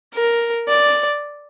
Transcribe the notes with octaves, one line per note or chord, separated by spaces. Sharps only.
A#4
D5